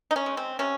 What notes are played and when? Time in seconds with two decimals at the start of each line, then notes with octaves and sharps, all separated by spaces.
0.11 D#4
0.16 C#4
0.26 G#3
0.37 C4
0.59 C3 C#4